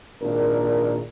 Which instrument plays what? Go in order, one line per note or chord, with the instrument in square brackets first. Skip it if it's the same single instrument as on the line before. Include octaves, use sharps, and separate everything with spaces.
[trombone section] G#1 A#2 D4 A#4